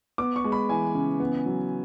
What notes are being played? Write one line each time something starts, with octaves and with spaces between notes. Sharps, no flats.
B3 D6
C#6
G#3
B5
E3 G#5
C#3
B3
F#3